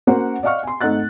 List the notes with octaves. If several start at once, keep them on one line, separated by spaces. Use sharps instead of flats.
A#3 C#4 F#4 A#4 C5 F#5
D5 D#5 F5 F#5 C#6 F6
G#5 C6
G#1 A3 D#4 F#5 F#6 A6